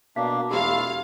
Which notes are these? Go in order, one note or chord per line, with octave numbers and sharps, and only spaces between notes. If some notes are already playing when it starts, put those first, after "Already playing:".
B2 A#3 D4 F5
E1 A3 E4 F4 G4 F5